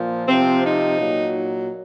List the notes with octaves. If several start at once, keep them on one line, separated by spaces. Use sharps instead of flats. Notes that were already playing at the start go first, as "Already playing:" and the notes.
Already playing: A#2 F3
C3 F3 C4
D#4
A#2 F#3